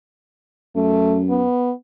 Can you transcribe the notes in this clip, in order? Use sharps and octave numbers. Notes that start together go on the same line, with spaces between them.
F#2 A3
B3